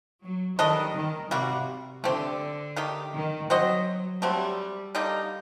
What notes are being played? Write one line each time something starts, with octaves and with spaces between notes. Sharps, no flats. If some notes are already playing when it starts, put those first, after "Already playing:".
F#3
D#3 G3 D4 A4 D#5
D#3
C3 G3 A#3 F#4
D3 A3 C4 G4
D#3 A3 D#4 G4
D#3
F#3 C4 F#4 C5 D#5
D3 F#3 G3 A3 C4
D3 G3 A#3 D#4